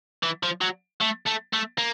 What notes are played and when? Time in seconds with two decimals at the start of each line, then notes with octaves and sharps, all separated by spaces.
0.23 E3
0.43 F3
0.61 F#3
1.01 A3
1.26 A3
1.53 A3
1.78 A#3